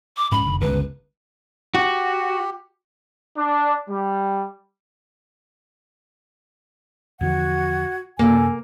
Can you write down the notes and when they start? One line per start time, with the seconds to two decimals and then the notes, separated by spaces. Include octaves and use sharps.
0.17 D6
0.32 G#2 C#4 B5
0.45 F1 D3
0.61 G1 C#2 C#3 B4
1.75 F#4 G4
3.37 D4
3.89 G3
7.21 E2 D3 F3 F#4 F#5 G#6
8.19 F#2 C3 A#3 A4 G#5